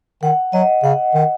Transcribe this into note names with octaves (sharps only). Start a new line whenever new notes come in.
D#3 F#5
F#3 D#5
C#3 F#5
D#3